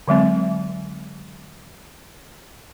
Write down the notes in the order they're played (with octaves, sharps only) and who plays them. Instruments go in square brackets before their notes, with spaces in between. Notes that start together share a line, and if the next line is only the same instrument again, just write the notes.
[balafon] D3 F#3 G#3 C4